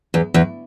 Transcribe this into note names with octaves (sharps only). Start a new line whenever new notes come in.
E2
E2